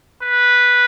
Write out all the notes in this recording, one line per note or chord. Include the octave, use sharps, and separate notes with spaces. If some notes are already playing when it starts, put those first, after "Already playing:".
B4